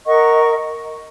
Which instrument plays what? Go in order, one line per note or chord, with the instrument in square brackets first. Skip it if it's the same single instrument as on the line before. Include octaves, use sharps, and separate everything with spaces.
[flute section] A#4 D#5 F#5 C#6